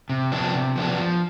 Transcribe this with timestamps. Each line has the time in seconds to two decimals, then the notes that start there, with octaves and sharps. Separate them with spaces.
0.10 C3
0.32 F3 B3 D4
0.53 C3
0.76 F3 B3 D4
0.98 F3